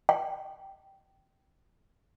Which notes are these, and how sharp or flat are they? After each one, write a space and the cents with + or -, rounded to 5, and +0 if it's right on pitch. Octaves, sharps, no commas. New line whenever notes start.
G5 -15